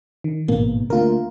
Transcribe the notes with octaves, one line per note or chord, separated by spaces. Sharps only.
D#3
A1 G#2 B2 A#3
D2 A3 A#3 F4 A#4